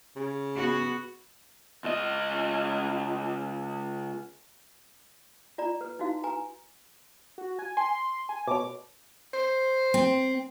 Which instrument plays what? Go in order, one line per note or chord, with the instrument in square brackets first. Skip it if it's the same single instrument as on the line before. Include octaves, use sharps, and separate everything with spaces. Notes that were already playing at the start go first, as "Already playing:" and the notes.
[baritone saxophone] C#3
[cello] B3 F#4
[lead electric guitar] C#2 D#5
[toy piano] F4 D5 A#5
B4
D#4 E4 F#4 F5
B4 G#5 A#5
[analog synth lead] F#4
G#5
[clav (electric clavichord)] G#5 [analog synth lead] C6
[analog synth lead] G#5
[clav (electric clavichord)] B2 C#5 [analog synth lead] D6
[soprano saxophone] C5
[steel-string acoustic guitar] C4